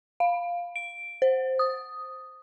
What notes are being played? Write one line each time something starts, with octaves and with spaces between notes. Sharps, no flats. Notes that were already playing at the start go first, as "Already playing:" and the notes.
F5
D7
C5
D#6